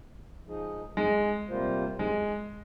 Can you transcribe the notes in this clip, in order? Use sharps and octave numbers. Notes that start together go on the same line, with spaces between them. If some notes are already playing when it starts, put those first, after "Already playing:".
F3 G#3 D#4 G#4 D#5
G#3
C3 G3 A#3 F4 C5
G#3